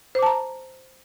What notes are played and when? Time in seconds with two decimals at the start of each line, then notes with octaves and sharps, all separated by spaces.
0.15 C5
0.19 D6
0.23 A5
0.26 A#5